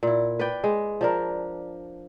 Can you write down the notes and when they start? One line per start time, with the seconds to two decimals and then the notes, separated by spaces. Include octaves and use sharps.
0.03 A#2 E4
0.39 B4 D5 G5
0.64 G#3
1.01 F3 D4 A#4